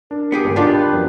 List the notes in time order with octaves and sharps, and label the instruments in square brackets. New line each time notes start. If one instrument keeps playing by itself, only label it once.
[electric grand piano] D4 [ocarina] A#4
[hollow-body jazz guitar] B3 G4 G#4
[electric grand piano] G1 D#2 G#2 [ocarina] A#4
[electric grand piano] D3 D#4 [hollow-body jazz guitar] D4 F4 G4
[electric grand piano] G5 B5 F#6
F#2 F3 B3